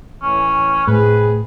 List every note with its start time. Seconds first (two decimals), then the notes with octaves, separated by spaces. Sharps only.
0.23 A2 E3 C#4
0.88 A2 C3 G#4 B4